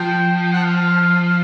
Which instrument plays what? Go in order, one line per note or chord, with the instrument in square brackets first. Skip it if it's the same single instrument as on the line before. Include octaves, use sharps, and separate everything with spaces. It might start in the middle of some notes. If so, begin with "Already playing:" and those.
Already playing: [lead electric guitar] F3 [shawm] G5
[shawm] G5
F#5
F5